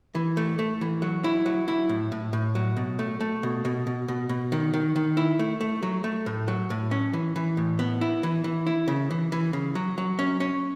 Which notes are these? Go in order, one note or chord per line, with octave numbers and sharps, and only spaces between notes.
E3
A3
A3
E3
F#3
E4
F#3
E4
A2
A2
A2
F#3
B2
A3
A3
B2
B2
B2
B2
B2
D#3
D#3
D#3
E4
A3
A3
F#3
A3
A2
F#3
A2
C#4
E3
E3
A2
B3
E4
E3
E3
E4
C#3
E3
E3
C#3
F#3
F#3
C#4
C#4